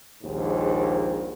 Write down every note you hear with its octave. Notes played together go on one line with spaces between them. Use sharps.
A#1 D#2 G#2